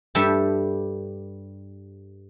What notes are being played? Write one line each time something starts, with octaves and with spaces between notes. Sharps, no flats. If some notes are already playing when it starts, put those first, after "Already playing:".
G2 G3 A4 E5 A5